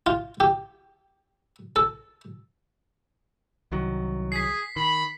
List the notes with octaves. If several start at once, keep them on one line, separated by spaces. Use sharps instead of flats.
F4
G4
A4
C2 D#3 F#3
G#4 B6 C7
D#3 B5